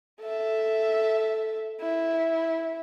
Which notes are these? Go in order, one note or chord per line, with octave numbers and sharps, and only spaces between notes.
A4 E5
E4